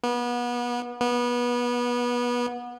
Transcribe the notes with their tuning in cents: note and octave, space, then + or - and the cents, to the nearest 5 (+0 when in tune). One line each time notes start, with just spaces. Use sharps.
B3 -30
B3 -25